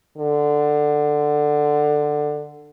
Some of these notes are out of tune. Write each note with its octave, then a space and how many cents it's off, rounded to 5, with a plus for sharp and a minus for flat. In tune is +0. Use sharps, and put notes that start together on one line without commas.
D3 +15